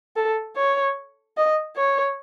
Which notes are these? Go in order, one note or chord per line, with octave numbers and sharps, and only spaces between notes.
A4
C#5
D#5
C#5